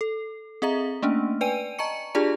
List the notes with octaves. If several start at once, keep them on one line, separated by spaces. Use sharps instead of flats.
A4
C4 G#4 D#5 E5 A#5
A3 A#3 C#4 D4
B4 D5 G5 G#5 D#7
D#5 A5 A#5 C#6 C#7
D4 F4 G4 G#4 D5 A5